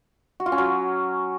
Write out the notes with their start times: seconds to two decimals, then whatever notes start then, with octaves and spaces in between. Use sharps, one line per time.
0.40 F#4
0.46 F4
0.52 C#4
0.58 F#3